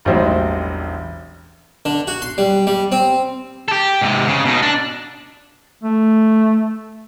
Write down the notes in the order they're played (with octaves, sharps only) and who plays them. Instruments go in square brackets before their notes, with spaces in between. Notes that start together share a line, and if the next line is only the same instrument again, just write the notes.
[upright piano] E1 A1 F#3 G3 D#4 C5
[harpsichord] D3
F#4
C6
G3
G3
C4
[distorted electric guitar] G4 A4
G#2 C3
C#3
B2 D#4
D4
[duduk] A3